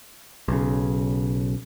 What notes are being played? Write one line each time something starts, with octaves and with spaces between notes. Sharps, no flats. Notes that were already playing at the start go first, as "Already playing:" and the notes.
B1 C#3